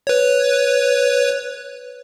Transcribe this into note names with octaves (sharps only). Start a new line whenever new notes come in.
B4 C#5